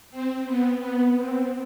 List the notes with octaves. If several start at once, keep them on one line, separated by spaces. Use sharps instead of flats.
C4
B3
B3
C4